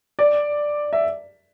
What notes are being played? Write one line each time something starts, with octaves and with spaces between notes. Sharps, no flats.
D5
E5